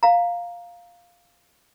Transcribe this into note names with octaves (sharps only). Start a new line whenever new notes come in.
F5 A#5